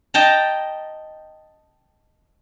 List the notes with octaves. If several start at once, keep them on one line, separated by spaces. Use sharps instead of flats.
D#5 G5 A5 A#5